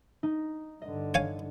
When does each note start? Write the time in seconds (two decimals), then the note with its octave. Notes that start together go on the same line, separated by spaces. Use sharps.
0.23 D#4
0.82 G2 D3 D#5
1.14 C#5 F5 G#5